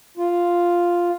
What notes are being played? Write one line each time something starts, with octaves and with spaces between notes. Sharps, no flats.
F4